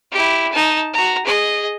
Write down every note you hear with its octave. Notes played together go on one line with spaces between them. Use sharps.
E4 G4
D#4 A5
F#4 A#5
G#4 D#5